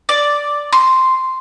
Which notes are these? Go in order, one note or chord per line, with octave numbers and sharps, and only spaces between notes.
D5
C6